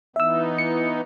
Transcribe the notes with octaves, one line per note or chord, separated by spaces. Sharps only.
E3 B3 D#4 E5 E6
C#7